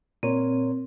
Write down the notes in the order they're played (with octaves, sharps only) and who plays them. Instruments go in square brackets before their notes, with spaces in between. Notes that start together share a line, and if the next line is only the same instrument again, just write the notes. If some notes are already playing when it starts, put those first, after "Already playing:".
[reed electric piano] A#2 A#4 C#5 [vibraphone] C4